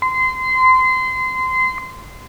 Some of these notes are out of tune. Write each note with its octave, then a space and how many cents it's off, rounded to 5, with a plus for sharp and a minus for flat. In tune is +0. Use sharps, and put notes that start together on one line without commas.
C6 -25